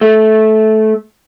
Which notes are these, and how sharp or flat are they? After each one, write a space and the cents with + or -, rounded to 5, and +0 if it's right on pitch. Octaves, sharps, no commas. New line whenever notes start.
A3 -15